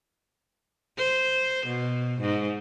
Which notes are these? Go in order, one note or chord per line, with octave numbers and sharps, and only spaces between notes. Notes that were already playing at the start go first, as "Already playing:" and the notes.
C5
B2
G#2